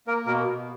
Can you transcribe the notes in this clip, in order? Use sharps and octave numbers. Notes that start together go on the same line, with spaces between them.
A#3 A#4
B2 A#4
B2